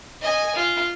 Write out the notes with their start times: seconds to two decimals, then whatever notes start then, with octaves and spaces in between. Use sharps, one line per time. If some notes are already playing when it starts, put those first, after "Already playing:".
0.22 D#5 G#5
0.56 F4